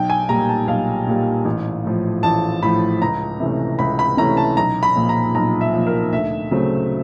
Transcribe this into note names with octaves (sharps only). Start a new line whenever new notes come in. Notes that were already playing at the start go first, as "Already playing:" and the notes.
Already playing: B1 G5
G#5
A#2 G3 A#5
A5
B1 F5
A#2 G3
A1
A2 F3
A1 A5
A2 F3 B5
C#2 A#5
C3 E3 A3 C#4
C#2 B5
B5
C3 E3 A3 C#4 A#5
A5
B1 A#5
B5
A#2 F3
A#5
B1 A#5
E5
A#2 F3
A#4
D2 E5
C#3 F#3 A3 C4